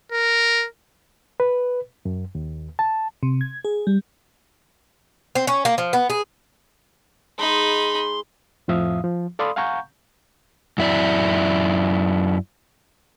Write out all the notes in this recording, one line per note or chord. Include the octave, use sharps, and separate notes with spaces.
A#4
B4
F#2
D#2
A5
C3
G#6
G#4
G3
C4
C#4
A#3
F3
B3
G#4
G#3 D#4 B5 C6
F2 A2 F3 E5 F5 D#6
F3
A4 D5 F5 B5 C6 D#6
F5 F#5 G#5 A#5 C#6 G6
F#2 E4 D5